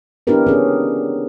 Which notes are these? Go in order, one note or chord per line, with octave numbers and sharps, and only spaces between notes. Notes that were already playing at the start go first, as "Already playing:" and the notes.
B3 D4 E4 G4 A#4 B4
C#4 G#4